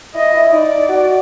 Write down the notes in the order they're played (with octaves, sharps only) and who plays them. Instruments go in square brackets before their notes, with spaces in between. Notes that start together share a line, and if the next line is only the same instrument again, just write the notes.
[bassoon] E4 [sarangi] D#5
[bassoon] E4
[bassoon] D#4 [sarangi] D5
[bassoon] F#4